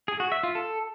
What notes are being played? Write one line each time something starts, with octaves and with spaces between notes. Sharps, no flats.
G#4
F#4
E5
F4
A4